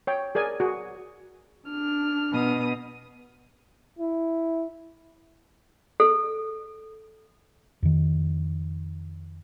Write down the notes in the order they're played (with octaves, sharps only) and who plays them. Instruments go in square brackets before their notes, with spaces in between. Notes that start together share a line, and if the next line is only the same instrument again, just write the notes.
[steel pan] C#5 G5
G#4 A#4 D5 G#5
F#4 G#4
[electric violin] D4 F6
[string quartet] B2 D#6
[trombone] E4
[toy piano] A4
[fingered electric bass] F2 D#3